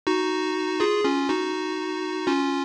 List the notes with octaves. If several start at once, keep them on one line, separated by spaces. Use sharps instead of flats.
D#4 F#4
F4 G#4
C#4 F4
D#4 F#4
C#4 F4